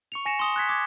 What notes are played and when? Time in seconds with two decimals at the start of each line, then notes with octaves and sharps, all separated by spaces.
0.12 C#6 C#7 F7
0.26 G#5 A#6 C#7 E7
0.39 C6 D#6 G7
0.56 F#6 G#6 B6
0.69 D6 G#6